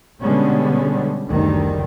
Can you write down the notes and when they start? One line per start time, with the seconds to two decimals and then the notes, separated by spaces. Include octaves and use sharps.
0.24 B2 D3 G3 G#3 B3 C#4
1.30 F#1 D2 D3 D#3 G3